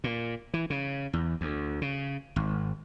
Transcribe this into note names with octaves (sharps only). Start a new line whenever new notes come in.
A#2
E3
C#3
E2
D2
C#3
G#1